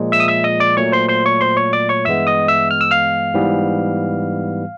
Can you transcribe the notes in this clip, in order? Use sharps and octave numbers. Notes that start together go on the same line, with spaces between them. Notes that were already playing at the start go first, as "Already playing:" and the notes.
Already playing: A#2 F3 G#3
E5 E6
D#6
E5 E6
D#5 D#6
D5 D6
A#2 F#3 A3 C#5 C#6
C5 C6
C5 C6
C#5 C#6
C5 C6
C#5 C#6
D5 D6
C#5 C#6
G2 E3 G#3 B3 E5 E6
D#5 D#6
E5 E6
F6
E6
F5 F6
G#2 E3 G3 B3